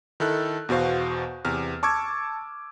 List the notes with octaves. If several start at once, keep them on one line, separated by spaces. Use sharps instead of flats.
D#3 E4 A4 F#6
E2 B2 F#4 C5 F5
E2 C3 F6
A5 C#6 D6 E6 G#6